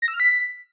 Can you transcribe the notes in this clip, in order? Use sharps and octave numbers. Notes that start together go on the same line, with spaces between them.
A#6
E6
F6
B6